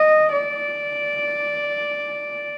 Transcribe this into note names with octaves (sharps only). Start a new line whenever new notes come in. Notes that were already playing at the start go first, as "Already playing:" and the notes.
Already playing: D#5
D5